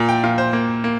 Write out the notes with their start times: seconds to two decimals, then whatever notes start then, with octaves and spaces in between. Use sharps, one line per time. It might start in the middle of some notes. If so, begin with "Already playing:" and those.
Already playing: A#2
0.09 G5
0.24 A#2 F5
0.38 C5
0.53 A#3
0.84 A#3